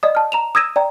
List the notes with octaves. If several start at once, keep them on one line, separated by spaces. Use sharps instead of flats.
D5 D#5 D#6
A5 F6
A#5 E7 F7
D#6 E6 G#6 A#6 D#7 E7
D5 G5 A#5